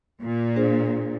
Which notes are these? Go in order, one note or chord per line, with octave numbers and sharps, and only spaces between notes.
A#2
D4 G#4 C5